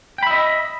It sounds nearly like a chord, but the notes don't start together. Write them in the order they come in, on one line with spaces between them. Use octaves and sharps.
G5 B5 E5 D#5